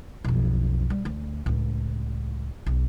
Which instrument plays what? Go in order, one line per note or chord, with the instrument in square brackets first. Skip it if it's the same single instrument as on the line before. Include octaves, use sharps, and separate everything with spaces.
[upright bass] B1 F2
G3
D2
C#2 A2
B1